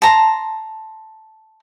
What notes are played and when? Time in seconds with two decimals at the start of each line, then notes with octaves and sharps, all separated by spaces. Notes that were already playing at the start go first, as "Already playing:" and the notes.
0.02 A5 A#5 C6